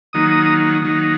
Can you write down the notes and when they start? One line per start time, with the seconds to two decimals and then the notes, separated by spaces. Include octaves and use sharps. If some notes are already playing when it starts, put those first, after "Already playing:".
0.13 D#3 F#3 A#3 D#4 D#6
0.82 D#3 F#3 A#3 D#4